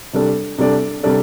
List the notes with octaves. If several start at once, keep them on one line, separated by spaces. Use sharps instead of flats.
C3 G3 D4 A4 D5
C3 G3 D4 A4 D5
C3 G3 D4 A4 D5